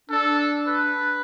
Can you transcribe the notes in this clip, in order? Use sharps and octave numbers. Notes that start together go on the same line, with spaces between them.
D4 A4
B4